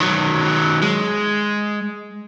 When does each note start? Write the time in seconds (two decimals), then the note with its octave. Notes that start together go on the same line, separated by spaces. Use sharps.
0.01 D#3 F#3
0.82 G#3